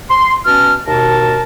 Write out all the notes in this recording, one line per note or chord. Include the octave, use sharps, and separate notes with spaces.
C6
B2 C#4 A5 F6
D#2 B2 A#4 A5